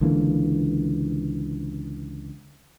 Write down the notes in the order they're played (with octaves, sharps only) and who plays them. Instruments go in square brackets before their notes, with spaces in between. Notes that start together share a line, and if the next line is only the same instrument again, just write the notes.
[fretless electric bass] C#2 D3 E3 A#3